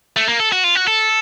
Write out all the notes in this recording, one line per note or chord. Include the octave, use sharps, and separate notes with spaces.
A3
A#3
A4
F#4
F4
F#4
A4